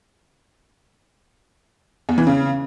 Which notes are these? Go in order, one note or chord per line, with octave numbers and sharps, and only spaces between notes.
E2
E3
C#3